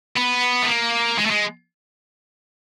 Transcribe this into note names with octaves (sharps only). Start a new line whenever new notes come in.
B3
A3
A#3
G#3
A3
G#3